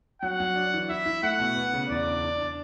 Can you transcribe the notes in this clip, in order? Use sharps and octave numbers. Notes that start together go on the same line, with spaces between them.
F#3 F#5
F#3
D4
E3
E4 E5
E4
A3 F#5
B2
B3
C#3
E2 D5
D4
D4
D4